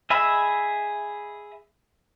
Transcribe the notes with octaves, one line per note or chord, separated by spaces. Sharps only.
G#4 D#5 E5 B5 E6